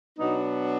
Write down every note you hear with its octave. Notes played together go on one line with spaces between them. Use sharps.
B2 F#3 B3 D4 D#4